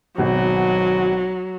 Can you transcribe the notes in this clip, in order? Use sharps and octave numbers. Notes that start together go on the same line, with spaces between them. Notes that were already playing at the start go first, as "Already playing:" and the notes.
G#1 B2 F#3